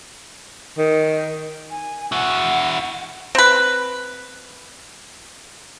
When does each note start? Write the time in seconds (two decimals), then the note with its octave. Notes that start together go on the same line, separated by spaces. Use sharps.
0.78 D#3
1.71 G#5
2.12 E4 F#4 F#5
3.35 C4 B4